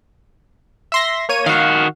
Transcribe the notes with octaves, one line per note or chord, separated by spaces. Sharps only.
E5 C6 A#6
A#3 C#5 D#7
D#3 F#4 F5